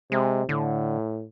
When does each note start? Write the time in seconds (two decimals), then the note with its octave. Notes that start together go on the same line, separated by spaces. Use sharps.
0.12 C3 G#3
0.49 A2 D3